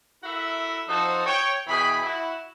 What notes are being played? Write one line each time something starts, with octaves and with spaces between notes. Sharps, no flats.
E4 F#4 A4 A#4 E5
F3 D#4 F#4 A4 C5
C#5 G5
B2 E3 G#4 G5 B5
E4 F#4